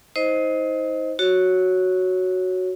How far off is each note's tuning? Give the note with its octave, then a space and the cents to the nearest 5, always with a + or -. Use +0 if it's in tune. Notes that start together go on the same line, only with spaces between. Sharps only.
D#4 +40 C5 +0 D#5 +5
F#4 +0 C#5 +0